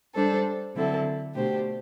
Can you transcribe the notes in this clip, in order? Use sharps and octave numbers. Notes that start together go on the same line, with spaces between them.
G3 D4 A4 C5
D3 F#3 C4 E4 A4
B2 A3 D4 G4 C5